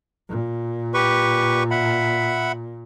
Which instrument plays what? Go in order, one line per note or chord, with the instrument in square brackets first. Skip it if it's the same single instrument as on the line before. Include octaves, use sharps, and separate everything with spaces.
[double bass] A#2
[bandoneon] G4 B4 C#6
E5 F#5 B5